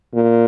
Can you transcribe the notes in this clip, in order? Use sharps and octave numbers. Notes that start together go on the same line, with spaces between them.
A#2